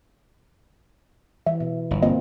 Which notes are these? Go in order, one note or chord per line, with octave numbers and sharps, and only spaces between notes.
E3 E5
B2
G1
A#3 C4 F4 D#5